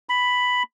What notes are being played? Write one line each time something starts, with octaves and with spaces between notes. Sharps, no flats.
B5